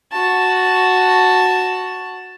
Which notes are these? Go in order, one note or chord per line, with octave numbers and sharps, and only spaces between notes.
F#4 A5